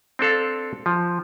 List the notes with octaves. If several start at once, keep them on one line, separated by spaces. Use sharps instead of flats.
C4 D4 A4 F5
F3